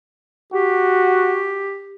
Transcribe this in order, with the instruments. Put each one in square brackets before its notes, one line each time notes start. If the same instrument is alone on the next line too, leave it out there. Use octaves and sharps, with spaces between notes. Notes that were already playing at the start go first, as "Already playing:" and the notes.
[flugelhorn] F#4 [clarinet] G4